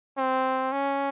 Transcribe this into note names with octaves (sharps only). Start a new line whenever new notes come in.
C4
C#4